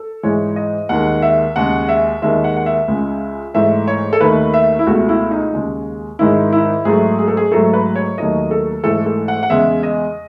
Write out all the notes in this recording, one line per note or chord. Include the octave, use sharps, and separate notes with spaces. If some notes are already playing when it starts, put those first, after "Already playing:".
Already playing: A4
G#2 E3 G#3 C#5
D#5
D#2 D#3 G#3 F#5
E5
D#2 C#3 G#3 F#5
E5
D#2 D#3 G#3 E5
F#5
F#5
E5
C#2 C#3 G#3
G#2 E3 A3 E5
C#5
A4
D#2 D#3 A3 B4
E5
E4
C#2 B2 A3 F#4
E4
D#4
D#2 C#3 G#3
G#2 D#3 G#3 E4
E4
G#2 F#3 A3 G#4
G#4
A4
G#4
G#2 F#3 A3 A4
B4
C#5
D#2 D#3 F#3 A3 D#5
A4
G#2 E3 A3 A4
A4
F#5
F#5
E2 C#3 G#3 E5
D#5